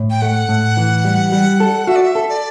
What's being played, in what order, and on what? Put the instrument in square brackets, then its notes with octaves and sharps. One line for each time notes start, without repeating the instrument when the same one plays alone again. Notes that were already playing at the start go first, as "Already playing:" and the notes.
Already playing: [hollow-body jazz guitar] A2
[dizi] G5
[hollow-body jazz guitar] A3 [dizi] F#5
[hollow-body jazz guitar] A2
E3
G3
G3
A4
[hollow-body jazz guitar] F#4 [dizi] E5
[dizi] D5
E5
[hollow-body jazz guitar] A4
[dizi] D5